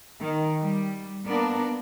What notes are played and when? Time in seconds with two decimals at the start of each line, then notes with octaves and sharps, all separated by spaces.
0.20 D#3
0.62 G3
1.26 A#3 B3 D4 A#4 D5